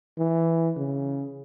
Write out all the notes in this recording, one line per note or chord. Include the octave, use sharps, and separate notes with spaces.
E3
C#3